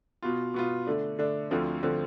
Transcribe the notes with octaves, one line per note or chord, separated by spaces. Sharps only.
B2 B3 F4
B2 B3 F4
D3 A3 D4
D3 A3 D4
D2 D3 F3 C4
D3 F3 C4